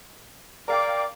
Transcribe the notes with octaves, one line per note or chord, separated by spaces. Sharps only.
A#4 D5 F5 G5 D6